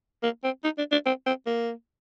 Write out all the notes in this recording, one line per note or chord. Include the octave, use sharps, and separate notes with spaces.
A#3
C4
D#4
D4
D4
C4
C4
A#3